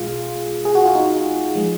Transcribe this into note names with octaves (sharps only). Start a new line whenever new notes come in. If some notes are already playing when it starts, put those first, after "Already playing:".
Already playing: B1 B2 G#3 F4 G#4
G#4
F#4
F4
D#4
F3 G#3